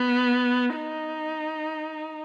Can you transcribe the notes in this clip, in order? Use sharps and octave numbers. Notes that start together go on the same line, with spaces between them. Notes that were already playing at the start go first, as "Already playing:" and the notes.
Already playing: B3
D#4